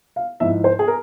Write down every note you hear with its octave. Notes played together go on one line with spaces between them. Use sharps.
F5
G#2 F3 G#3 E4 E5
C5
G#4
A#4